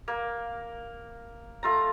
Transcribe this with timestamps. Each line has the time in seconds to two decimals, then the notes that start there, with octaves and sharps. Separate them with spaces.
0.08 A#3
1.63 A3 F4 A#5